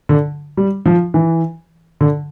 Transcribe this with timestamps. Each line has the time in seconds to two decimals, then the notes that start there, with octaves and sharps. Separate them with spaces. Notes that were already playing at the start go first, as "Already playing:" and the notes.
0.09 D3
0.57 G3
0.86 F3
1.14 E3
2.01 D3